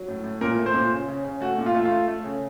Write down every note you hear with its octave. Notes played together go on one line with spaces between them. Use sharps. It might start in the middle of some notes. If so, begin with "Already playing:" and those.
Already playing: F#3
A2
A2
A#2 A#4
A3
C5
A#2
C#3
C#3
C#3
A3 F#4
A#2
F4
A3
F4
A3
A3
C#3